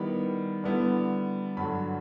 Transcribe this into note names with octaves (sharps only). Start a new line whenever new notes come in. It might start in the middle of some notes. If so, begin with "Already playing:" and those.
Already playing: D#3 G3 B3 E4 B5
D3 G3 B3 E4
G2 D3 F#3 B5